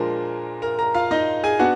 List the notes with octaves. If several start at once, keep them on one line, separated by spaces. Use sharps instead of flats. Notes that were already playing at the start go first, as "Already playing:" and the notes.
Already playing: A#2 F3 G#3 D4 A#4
A#4 A#5
A#4 A#5
F4 F5
D#4 D#5
G#4 G#5
B3 D4 F#4 F#5